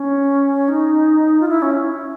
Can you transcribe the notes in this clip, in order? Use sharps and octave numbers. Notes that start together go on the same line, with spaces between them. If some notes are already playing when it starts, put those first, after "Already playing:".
Already playing: C#4
D#4
F4
E4
C#4